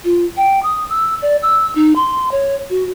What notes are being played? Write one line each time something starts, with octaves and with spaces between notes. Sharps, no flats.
F4
G5
D#6
E6
D5
E6
D#4
C6
C#5
F#4